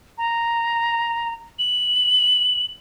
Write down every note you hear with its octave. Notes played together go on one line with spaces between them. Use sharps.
A#5
F#7